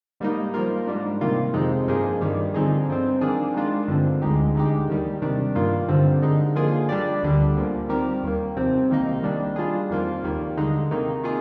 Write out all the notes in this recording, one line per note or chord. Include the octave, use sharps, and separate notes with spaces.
G#2 G3 A#3 D#4
F3 A#3 F4 A#4
G#2 G3 D4
C3 D#3 A#3 F4
F2 C3 F3 G#3 D#4
G2 F3 A#3 D#4 G#4
G2 D#3 G3
D3 F3 C4 D#4 G#4
G2 F3 C4
D#3 A#3 D4 G#4
D#3 G#3 D4 F4
G2 D3 F3 C4
D2 D3 G#3 D#4 G4
D3 G#3 D#4 G4
D#2 D#3 G3
C3 D#3 G3 D4
G2 D#3 A#3 F4
G2 D3 G3 C4
D3 G#3 D#4
D3 F3 A#3 F4 G#4
G3 D4 G4 D5
D2 D3 G3
A#2 F3 A#3
D#3 G3 C4 G4 A#4
D#2 D#3 A#3
C2 C3 F3 C4
C2 C3 D#3 A#3 D#4
D#3 G3 A#3 D4
G3 D4 F4 G#4
F2 D#3 A#3 F4
D#2 D#3 G3 A#3
D3 G#3 D#4
C3 D#3 A#3 D#4
C3 D#3 A#3 F4 G#4